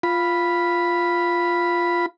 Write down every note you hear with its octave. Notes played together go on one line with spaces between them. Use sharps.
F4 B5